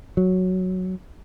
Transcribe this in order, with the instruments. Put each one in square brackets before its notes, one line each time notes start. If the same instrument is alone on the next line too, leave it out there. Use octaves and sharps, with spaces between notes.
[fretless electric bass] F#3